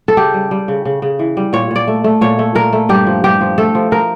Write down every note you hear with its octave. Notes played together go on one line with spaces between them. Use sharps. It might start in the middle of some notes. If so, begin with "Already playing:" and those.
A4
C#3 G4
G3
G3
C#3
C#3
C#3
E3
G3
A#2 C#5
A#2 D5
A3
A3
A#2 C#5
A3
A#2 A#4
A3
G2 G4
F3
G2 G4
F3
A3 A4
F3
F3 A#4